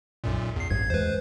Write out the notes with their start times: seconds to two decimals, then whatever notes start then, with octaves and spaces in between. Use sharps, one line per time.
0.24 B1 F#2 A#2
0.56 E2 C7
0.70 A1 G2 G#6
0.90 E2 G#3 B4 C5